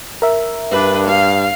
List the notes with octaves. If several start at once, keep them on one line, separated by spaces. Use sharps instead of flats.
A#4 E5
G2 D4 B4
F5